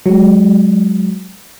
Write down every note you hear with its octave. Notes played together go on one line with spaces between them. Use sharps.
F#3 G#3